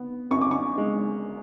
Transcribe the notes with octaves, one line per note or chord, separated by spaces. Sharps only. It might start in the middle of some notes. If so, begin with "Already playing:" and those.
Already playing: B3
F#2 C#6
D6
C#6
G#3